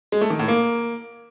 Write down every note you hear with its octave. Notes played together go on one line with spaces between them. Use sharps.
G#3
A3
D#3
A2
A#3